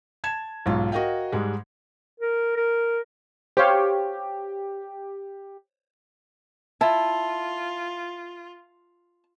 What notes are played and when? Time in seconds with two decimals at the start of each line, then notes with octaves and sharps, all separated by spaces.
0.24 A5 G#6 E7
0.66 B1 G#2 F4
0.92 F#4 A#4 D#5 F5 G5
1.32 G#2 G3 G#3
2.20 A#4
2.56 A#4
3.57 G4 C5 C#5 F5
6.81 E4 F4 A5